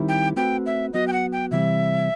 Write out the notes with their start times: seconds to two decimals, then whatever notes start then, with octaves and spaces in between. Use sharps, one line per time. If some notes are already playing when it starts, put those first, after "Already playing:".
Already playing: D#3 G3 C4 E4
0.09 G5
0.36 A3 C4 F#4 B4 G5
0.66 E5
0.93 F#3 B3 F#4 D#5
1.08 G5
1.13 F#5
1.32 G5
1.51 C3 E3 G3 C4 E5